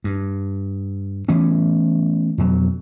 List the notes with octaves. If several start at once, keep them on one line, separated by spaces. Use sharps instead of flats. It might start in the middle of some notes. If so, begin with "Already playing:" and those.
G2
E3 A3 B3 C#4
F2 B2 F#3